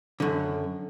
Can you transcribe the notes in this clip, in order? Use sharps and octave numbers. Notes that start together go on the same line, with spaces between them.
F#2 D3